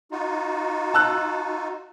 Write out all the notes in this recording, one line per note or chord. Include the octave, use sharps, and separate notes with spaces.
D#4 F4 F#4
A5 E6 F#6